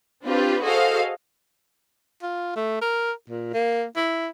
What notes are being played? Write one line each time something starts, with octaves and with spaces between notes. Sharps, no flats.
C4 D4 F4 G4 B4
F#4 G#4 A4 C5 D#5 F5
F4
A3
A#4
A#2
A#3
E4